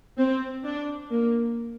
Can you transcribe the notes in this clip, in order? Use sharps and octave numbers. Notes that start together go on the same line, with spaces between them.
C4
D4
A#3